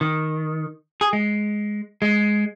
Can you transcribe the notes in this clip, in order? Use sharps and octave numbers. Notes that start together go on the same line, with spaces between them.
D#3
G#4
G#3
G#3